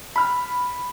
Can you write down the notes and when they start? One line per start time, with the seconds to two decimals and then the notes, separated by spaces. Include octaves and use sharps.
0.16 B5 F6